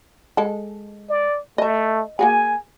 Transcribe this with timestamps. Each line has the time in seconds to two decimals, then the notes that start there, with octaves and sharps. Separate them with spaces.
0.37 G#3 A4
1.09 D5
1.58 A3 D#5 E5
2.19 A#3 F#4 G#4 G#5